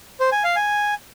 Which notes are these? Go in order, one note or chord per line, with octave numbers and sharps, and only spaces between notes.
C5
G#5
F5
G#5